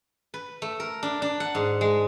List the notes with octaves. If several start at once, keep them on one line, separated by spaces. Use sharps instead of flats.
B4
A3
A#4
D4
D4
F#5
G#2
G#3